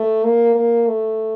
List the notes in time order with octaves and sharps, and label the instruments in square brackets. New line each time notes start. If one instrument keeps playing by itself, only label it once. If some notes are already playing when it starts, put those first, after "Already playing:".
Already playing: [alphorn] A3
A#3
A#3
A3